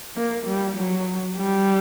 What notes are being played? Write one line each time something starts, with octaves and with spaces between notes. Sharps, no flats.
A#3
G3
F#3
G3